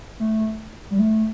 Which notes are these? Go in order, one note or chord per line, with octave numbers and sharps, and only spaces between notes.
A3
G3
A3